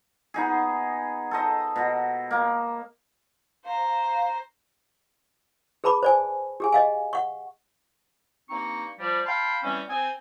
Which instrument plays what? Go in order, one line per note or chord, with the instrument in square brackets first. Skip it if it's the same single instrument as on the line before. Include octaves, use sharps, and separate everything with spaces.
[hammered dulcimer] B3 D#4 G#4
A4 C5 D#5
B2
A#3
[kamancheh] C5 A#5 [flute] F5
[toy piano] G#4 B4 A5 B5 D6
C5 D5 G#5
G4 G#4 G#5
D#5 F5 G#5
F#5 C#6
[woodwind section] G2 A#3 C4 D#4 C#6
F3 G3
F5 G5 A5 B5 C6 F6
E3 G3 C4 C#4
C4 G#5